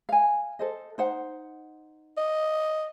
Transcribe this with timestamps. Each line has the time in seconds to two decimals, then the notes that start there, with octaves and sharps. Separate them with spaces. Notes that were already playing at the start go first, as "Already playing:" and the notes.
0.09 F5 G#5
0.59 A4 C5 D#5
0.98 D#4 C5 F#5
2.17 D#5